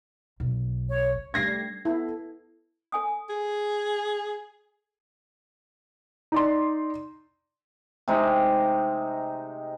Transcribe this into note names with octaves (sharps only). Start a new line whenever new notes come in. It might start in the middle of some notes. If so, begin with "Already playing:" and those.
B1 A#3
C#5
G3 A3 G#6 A#6 C7
B3 E4 A4
A4 G#5 D#6
G#4
D#4 D5 C6
C3 G#3 D#4